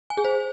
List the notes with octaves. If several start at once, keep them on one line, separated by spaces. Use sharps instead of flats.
G#5
G#4
C5